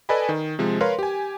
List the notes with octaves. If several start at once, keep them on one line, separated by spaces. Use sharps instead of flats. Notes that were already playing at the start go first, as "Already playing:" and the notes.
A4 B4 D5 D#5 G#5 B5
D#3
C3 F3 G#3
A#4 B4 C#5 F5 C6
G4 G#5